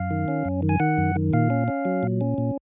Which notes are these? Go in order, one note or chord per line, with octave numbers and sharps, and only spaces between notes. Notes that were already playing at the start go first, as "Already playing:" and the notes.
Already playing: F#2 F5
D#3
C#4
F#2
D#3
G#5
D#3 F#5
F#2
D#3
A#2 F5
C#4
C#4
F#3
A#2
C#4
A#2